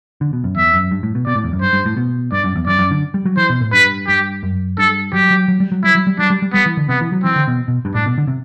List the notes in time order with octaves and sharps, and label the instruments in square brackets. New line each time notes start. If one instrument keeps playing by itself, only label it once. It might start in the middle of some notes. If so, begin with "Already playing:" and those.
[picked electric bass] D3
B2
F#2
[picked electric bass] E2 [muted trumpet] E5
[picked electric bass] F#2
G2
A2
B2
[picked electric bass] B2 [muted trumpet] D5
[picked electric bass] A2
E2
F#2
[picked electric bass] G2 [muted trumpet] C5
[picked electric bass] G2
A2
B2
[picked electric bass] G2 [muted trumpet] D5
[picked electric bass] F#2
E2
[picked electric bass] F#2 [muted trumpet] D5
[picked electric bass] F#2
D3
G3
F#3
[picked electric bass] E3 [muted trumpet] C5
[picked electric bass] B2
A2
[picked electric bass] G2 [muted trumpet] B4
[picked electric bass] G2 [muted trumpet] G4
[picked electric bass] F#2
[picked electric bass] G2 [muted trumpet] A4
[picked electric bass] F#3 [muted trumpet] G4
[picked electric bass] F#3
F#3
G3
F#3
[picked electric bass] G3 [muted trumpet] E4
[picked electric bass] F#3
G3
[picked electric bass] F#3 [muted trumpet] D4
[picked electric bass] G3
G3
[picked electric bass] G3 [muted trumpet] B3
[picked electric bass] E3
D3
[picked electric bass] C3 [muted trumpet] B3
[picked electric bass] E3
F#3
[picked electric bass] E3 [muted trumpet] C4
[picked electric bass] D3
B2
B2
G2
[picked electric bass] A2 [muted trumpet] D4
[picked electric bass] B2
D3
C3